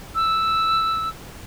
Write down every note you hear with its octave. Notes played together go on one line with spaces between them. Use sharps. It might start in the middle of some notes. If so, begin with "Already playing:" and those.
E6